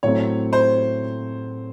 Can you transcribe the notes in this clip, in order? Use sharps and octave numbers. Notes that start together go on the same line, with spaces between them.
A2 F#3 A3 C4 C#5
C5